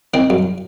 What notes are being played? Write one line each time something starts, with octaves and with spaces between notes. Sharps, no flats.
D#3 C4
F#2